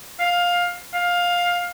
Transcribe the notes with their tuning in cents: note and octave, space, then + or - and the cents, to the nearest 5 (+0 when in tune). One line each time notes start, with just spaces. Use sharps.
F5 +15
F5 +15